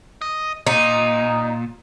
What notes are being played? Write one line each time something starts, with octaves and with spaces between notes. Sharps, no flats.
D#5
A#2 D#4